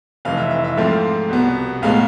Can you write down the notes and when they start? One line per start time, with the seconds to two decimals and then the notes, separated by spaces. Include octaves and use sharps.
0.25 F1 F2 E3 F5
0.37 E5
0.51 E5
0.64 E5
0.77 G#2 F3 A3 C4 F5
1.29 C2 B2 B3
1.82 B1 A2 G#3 F5